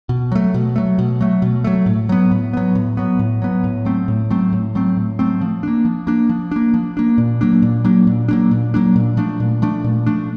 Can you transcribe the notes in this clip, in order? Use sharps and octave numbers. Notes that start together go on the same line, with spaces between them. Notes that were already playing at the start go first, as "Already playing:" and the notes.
B2
F#3 A3
B2
F#3 A3
B2
F#3 A3
B2
F#3 A3
A2
F#3 B3
A2
F#3 B3
A2
F#3 B3
A2
F#3 B3
A2
F#3 A3 C4
A2
F#3 A3 C4
A2
F#3 A3 C4
A2
F#3 A3 C4
F3
A#3 D4
F3
A#3 D4
F3
A#3 D4
F3
A#3 D4
A#2
F#3 A#3 D4
A#2
F#3 A#3 D4
A#2
F#3 A#3 D4
A#2
F#3 A#3 D4
A#2
F3 A3 D4
A#2
F3 A3 D4
A#2
F3 A3 D4